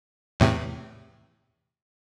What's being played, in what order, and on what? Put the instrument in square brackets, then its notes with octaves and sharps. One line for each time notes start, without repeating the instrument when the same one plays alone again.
[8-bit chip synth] E2 A2 C3